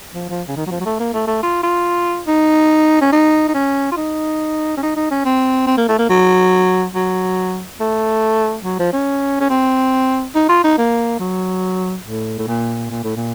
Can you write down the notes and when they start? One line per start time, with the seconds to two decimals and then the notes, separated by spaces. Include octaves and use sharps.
0.15 F3
0.29 F3
0.48 C#3
0.57 D#3
0.67 F#3
0.71 F3
0.80 F#3
0.85 A3
1.00 A#3
1.14 A3
1.27 A3
1.43 F4
1.63 F4
2.27 D#4
3.01 C#4
3.12 D#4
3.48 D#4
3.54 C#4
3.92 F4
3.97 D#4
4.77 C#4
4.83 D#4
4.96 D#4
5.11 C#4
5.25 C4
5.67 C4
5.77 A#3
5.89 A3
5.99 A#3
6.10 F#3
6.95 F#3
7.81 A3
8.65 F#3
8.79 F3
8.93 C#4
9.41 C#4
9.50 C4
10.35 D#4
10.49 F4
10.64 D#4
10.78 A#3
11.20 F#3
12.05 A2
12.39 A2
12.47 A#2
12.90 A#2
13.04 A2
13.16 A#2